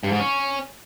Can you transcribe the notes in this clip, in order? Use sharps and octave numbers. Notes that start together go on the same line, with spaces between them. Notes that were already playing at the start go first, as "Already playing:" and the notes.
G2
G#2
C#4